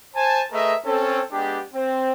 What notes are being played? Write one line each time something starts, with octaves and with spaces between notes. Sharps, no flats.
C5 G#5 A5
A3 G#4 A#4 B4 D#5 E5
C4 C#4 A4
G#3 B3 D4 G4
C4